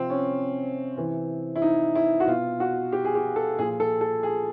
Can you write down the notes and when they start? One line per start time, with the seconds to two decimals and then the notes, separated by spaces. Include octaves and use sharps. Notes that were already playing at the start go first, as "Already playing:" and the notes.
Already playing: C3 F3 C4
0.10 C#4
0.97 C3 E3
1.56 E4
1.62 D#4
1.95 E4
2.20 F#4
2.27 B2 F4
2.60 F#4
2.92 G4
3.04 G#4
3.15 G4
3.36 A4
3.59 A#2 F3 G#4
3.80 A4
4.01 A4
4.23 G#4